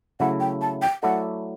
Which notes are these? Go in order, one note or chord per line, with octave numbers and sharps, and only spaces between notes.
C#3 F#3 A3 E4 F#5
G5
A5
G5
F#3 A3 E4 A4 D5 F#5